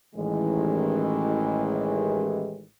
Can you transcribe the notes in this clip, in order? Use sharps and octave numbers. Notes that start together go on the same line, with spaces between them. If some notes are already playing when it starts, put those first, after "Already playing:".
A1 D#3 E3 G#3